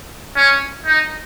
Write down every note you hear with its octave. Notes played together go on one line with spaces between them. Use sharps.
C#4
D#4